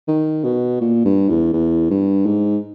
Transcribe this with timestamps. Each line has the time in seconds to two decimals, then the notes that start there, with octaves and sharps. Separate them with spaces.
0.08 D#3
0.44 B2
0.81 A#2
1.05 G2
1.29 E2
1.53 E2
1.90 G2
2.26 G#2